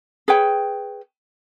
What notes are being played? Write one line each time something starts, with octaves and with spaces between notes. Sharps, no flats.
G#4 B4 C#5 G5